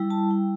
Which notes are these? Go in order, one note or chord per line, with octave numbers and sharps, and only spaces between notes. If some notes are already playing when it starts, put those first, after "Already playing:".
Already playing: G3 E4
A5
G5